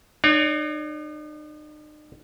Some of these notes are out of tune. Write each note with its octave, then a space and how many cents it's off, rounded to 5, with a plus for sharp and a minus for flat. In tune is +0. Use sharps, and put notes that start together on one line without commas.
D#4 -45 C#5 +30